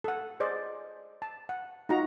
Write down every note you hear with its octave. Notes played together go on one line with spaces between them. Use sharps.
A4 F#5
G#4 C5 D5 D#5
A5
F#5
D#4 F4 F#4 A#5